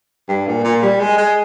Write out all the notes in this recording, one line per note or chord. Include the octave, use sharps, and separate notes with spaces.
G2
A#2
A#2
G3
G#3
G#3